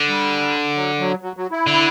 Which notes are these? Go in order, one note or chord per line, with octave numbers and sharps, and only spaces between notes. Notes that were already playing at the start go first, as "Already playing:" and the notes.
Already playing: D3
G3
F#3
F#3
F#3
F#3
E4
D3